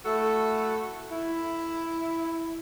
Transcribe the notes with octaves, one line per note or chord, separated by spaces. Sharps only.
A3 E4 F#4 A4
E4